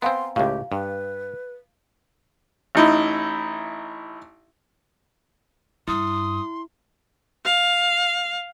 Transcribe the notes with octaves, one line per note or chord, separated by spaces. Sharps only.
B3 C4 F5 G#5 A#5 C6
C#2 A2 G4 F5
G2 B4
A1 D#4 E4
G2 E4 C6 D#6
F5